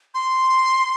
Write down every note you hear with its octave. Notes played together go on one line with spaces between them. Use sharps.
C6